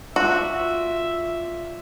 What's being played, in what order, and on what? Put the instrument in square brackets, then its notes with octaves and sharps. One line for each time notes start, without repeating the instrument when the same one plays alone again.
[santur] F4 D5 [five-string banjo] F#4 [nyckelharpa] E5